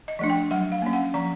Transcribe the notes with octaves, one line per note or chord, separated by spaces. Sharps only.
D#5
F3 A3 D4
G5
F#3 F#5
F5
A#3 C#4
F#5
F3 A#5